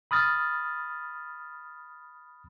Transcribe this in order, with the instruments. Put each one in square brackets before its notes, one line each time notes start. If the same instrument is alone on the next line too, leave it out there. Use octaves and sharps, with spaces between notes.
[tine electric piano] B5 D#6 F6 A6